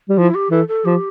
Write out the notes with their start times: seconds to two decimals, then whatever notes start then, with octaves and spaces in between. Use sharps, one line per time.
0.09 G3
0.18 F3 E4
0.35 G4
0.51 E3 A4
0.68 A4
0.85 F3 G4